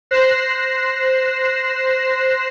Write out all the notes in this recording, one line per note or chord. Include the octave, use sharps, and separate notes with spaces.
C5 F#6 A#6 C7 E7